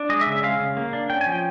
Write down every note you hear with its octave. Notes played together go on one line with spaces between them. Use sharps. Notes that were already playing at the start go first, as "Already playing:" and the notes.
Already playing: D4
G#3 D#5
E5
C#3
E5
G#3 F5
C#3
A#3
D4
C#4 G5
G#5
F3
G5